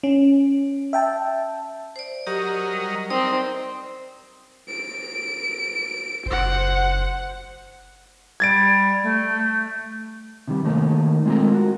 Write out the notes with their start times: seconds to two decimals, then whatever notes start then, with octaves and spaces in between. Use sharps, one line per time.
0.03 C#4
0.93 E5 G5 A5
1.96 C5 D5
2.27 F#3 G4 A#4 D#5
2.73 G3
3.10 C4 D#4 A#4 D5
4.69 D7
6.26 F#1 C5 F#5
8.40 G3 G#6 A6 D7
9.03 A3
10.48 C3 D#3 G3
10.65 D#3 A3 A#3 D#4
11.26 G#3 C4 F4 F#4 A4 A#4
11.54 F#4